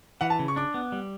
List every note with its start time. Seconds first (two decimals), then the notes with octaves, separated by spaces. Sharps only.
0.21 E3 F#5
0.30 A5
0.39 C#3
0.48 C#6
0.56 D4 D6
0.74 B3
0.92 G3